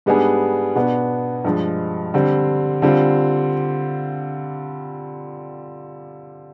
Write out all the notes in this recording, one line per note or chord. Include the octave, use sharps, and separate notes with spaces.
G#2 G3 B3 D4 G#4
B2 B3 D4
G2 F3 G#3
D3 G3 C4
D3 G3 C4 F4